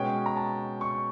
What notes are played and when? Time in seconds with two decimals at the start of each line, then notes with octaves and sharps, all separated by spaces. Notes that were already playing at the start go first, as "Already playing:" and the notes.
Already playing: B2 G#3 C#4 G5
0.26 A#5
0.37 A5
0.81 C#6